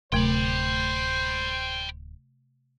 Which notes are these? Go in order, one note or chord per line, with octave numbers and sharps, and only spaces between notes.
D1 C3 A3 C5 G5 B5